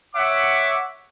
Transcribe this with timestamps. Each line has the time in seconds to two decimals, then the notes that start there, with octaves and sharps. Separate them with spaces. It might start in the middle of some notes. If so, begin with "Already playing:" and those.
0.15 C#5 E5 F#5 D6